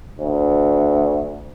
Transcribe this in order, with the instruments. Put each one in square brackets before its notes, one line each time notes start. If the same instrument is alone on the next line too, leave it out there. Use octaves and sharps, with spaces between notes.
[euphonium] D2